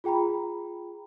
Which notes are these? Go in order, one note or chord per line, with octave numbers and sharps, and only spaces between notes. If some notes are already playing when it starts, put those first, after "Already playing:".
F4 G#4 G5 A#5 B5